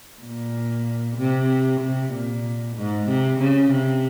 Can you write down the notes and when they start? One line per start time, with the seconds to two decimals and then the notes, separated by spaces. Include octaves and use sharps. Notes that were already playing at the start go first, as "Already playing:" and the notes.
0.22 A#2
1.17 C3
1.80 C3
2.13 A#2
2.77 G#2
3.08 C3
3.40 C#3
3.72 C3